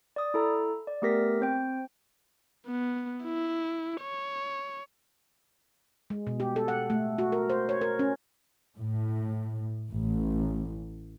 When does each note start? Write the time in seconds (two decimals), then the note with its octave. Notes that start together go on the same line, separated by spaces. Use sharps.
0.16 D5 D#6
0.34 E4 A4 A#5
0.87 D5
1.02 A3 B3 G4 A#4 A#6 B6
1.41 C4 C5 G5
2.66 B3
3.25 E4
4.02 C#5
6.10 G#3
6.27 B2
6.40 G4
6.56 A4
6.68 F#5
6.90 A3
7.18 F#4
7.32 A#4
7.50 C5
7.69 C#5
7.81 A#4
7.99 C#4
8.77 A2
9.89 A1